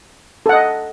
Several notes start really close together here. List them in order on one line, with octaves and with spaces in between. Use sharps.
A4 F#5 D#5